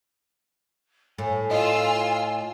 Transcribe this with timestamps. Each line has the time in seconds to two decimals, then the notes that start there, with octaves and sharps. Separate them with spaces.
1.18 A2 G#5
1.51 F4 D#5 E6